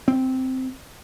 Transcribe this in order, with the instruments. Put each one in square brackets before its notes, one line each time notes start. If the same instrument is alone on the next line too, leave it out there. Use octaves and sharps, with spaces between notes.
[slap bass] C4